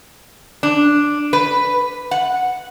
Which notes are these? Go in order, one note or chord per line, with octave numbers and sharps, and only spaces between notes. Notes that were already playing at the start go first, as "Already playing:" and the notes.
D4
B4
F#5